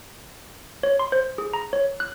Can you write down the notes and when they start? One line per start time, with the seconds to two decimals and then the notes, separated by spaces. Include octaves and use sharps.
0.83 C#5
0.99 C6
1.12 C5
1.38 G#4
1.54 A#5
1.73 C#5
2.00 F#6